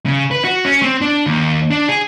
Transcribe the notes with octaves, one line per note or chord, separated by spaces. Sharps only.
C#3
B4
F#4
C#4
C4
D4
D#2
D4
G#4